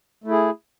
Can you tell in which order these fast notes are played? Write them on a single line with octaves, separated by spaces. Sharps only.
A3 E4 G#4